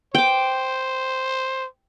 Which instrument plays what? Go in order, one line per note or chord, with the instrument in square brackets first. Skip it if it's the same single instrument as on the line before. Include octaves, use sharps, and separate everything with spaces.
[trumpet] C5 [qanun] G5 D6